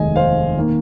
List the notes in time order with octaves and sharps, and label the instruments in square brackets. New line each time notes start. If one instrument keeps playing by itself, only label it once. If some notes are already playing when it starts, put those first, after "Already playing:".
Already playing: [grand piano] F1 D#2 D#3 G#3 D#5 G#5
C5 F5
D#3 A#3